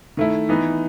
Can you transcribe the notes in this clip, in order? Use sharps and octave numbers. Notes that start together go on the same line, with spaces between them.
D#3 A3 E4
E3 B3 D#4